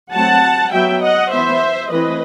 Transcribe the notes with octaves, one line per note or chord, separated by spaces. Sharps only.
F#3 A3 C4 F#5 A5
F#3 B3 E5 G5
D#5 F#5
E3 B3 C5 E5
E3 A3 C4 B4 D#5